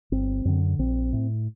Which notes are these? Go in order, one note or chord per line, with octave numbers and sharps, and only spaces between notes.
G1 C4
F#2 D3
A#1 C4
A2